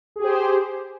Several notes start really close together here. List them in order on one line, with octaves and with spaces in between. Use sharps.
G#4 G4 C5